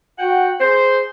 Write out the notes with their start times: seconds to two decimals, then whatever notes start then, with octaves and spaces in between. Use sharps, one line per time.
0.19 F#4 F#5 G5
0.61 G#4 C5